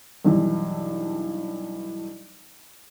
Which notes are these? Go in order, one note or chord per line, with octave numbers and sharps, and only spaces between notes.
B1 G2 E3